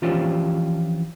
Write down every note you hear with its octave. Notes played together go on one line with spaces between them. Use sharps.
E3 F3 C#4 D4 F4 G4